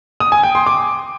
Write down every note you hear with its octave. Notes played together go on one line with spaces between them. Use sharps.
D#6
G#5
G5
C6
D6